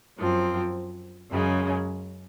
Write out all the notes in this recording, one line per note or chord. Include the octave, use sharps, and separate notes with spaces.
F#2 F3 C4
F#2 C#3 G#3 C#4